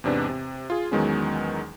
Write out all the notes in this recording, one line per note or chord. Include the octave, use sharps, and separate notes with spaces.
E2 G#2 C3 D4 B4
C3
F4 G#4
E2 D#3 F#3 G#3 B3 C#4